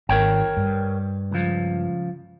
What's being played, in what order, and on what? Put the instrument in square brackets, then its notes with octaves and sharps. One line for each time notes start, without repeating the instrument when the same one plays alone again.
[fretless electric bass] G#1 [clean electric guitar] A#4 C#5 G5
[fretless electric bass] G2
[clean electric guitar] C#2 F3